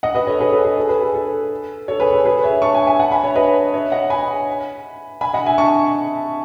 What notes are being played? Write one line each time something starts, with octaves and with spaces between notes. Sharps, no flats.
D#5 F#5
B4 D#5
A4 C#5
G#4 B4
A4
G#4
A4
G#4 B4
A4
A4
A4 C#5
G#4 B4
A4
G#4 B4
C#5 E5
A5 C#6
E5 G#5
E5 G#5
F#5 A5
G#5 B5
C#5 E5
B4 D#5
C#5 E5
D#5 F#5
G#5 B5
G#5 B5
D#5 F#5
E5 G#5
A5 C#6